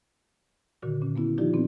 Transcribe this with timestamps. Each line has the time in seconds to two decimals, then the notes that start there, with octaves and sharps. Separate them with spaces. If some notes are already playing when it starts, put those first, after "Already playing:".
0.82 A#2 D3 D#3 F#4
1.02 A#2 C#4
1.16 A#3 B3 E4
1.38 D#3 F3 D#4 F4 G4 D5
1.53 A#2 B3 C4